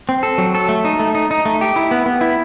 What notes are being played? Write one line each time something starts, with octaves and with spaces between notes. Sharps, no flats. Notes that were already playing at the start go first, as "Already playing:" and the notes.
C4
A4
F#3
A4
A3
D#4
A3
D#4
D#4
A3
G4
E4
B3
B3
E4